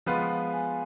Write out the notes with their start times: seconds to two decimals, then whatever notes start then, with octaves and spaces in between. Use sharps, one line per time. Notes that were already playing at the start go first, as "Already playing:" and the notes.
0.06 F3 G#3 B3 F4 B4 F5
0.31 F5
0.53 G#5